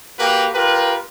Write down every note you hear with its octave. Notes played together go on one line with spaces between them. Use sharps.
A#3 F#4 G4 A#4 B4
F4 G4 A#4 B4